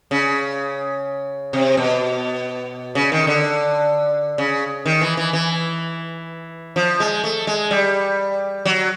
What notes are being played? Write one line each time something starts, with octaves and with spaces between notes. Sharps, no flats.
C#3
C3
B2
C#3
D#3
D3
C#3
D#3
E3
E3
E3
F3
G#3
A3
G#3
G3
F#3